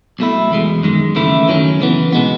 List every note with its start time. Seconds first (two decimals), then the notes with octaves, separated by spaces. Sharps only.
0.19 B1 B2 A3 E4
0.51 E2 B2 G#3
0.83 F#2 D#3 G#3
1.15 D#2 C#3 E3 A3 E4
1.48 F#2 D#3 F#3 C#4
1.80 C#3 E3 B3
2.12 B2 G#3 B3